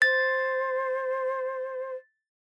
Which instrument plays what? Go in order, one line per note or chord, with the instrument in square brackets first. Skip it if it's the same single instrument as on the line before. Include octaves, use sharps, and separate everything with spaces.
[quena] C5 [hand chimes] A6